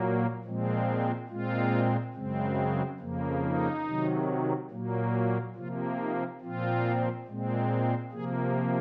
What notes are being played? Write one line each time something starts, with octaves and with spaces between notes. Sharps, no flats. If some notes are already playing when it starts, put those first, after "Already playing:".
Already playing: A#2 F#3 A#3
A#2 F3 G#3 C4
A#2 G#3 C4 F4
F#2 C#3 G#3 C4
F2 C#3 F3 A#3
D#4
C3 D#3 F#3
A#2 F#3 A#3
C3 F3 A#3 F4
D#4
A#2 F3 C4 F4
A#2 G#3 C4
C3 F3 A#3 G#4